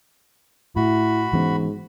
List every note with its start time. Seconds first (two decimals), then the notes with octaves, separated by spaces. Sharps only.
0.76 A2 E4 F#4 B5
1.33 G#2 E3 B3 C#4